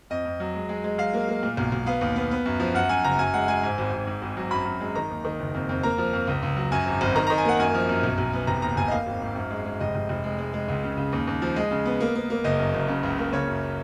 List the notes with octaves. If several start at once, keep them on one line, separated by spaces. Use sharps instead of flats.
F2 D#5
F2
F#3
G#3
G#3
G#3
F#3 F5
A#3
A#3
A#2
B1
B1
B3 F5
D#2
B3
B3
F#2
F3
F#2 F#5
F#2 G#5
F#1 A#5
F#2 G#5
G#3 F#5
G#3 G#5
G#2 G#5
G#1
G#1
G#2
G#1
F#3
F#2 B5
F#2
G#3
D#3 A#5
D#2
D#3
F#1
F2
F2
A#3 A#5
F3
F2
C#2
C#2
F#3
F#2 G#5
G#1
G#1
D#3 A#5
D#3 A#5
G#5
A#3 F#5
F#2 G#5
F3
F#2
B1
B1
B3
F1 A#5
D#2 A#5
F1 G#5
D#5
A#3 F5
G#1
G#2
F#2
G#3
G#3
F1 D#5
F1
F1
G#3
G#3
G#3
C#2
C#3
C#3
D#2
D#2
F3
G#3 D#5
C#3
B3
A#3
A#3
A#3
F#1 D#5
F#2
F#1
C#3
C#2
A#3
C#3 C#5
F#2